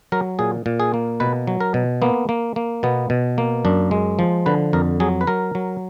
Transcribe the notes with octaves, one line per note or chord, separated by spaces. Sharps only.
F#3 A#4
A#2 G#4
A#2
G#4
A#3
B2 B4
F#3
A#4
B2
A#3 B3
A#3
A#3
B2 B3
B2
A#3
F#2 D4
G#3
F3
D3 B4
F2 A#4
F#3 G#4
B4
F#3 A#4
F#3